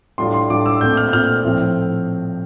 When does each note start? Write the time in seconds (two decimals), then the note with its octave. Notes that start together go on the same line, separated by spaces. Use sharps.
0.18 A2 G3 D4 F4 C6
0.34 C6
0.49 A2 G3 D4 F4 D6
0.66 E6
0.81 A#2 A3 C4 G6
0.97 F6
1.08 G6
1.12 A#2 A3 C4 F6
1.45 A2 F3 C4 E4